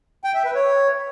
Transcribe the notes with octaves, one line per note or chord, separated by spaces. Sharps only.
G5
E5
B4
C#5